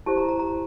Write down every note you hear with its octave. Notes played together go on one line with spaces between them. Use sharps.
E4 G4 C5 A5
A#5
A#5
A#5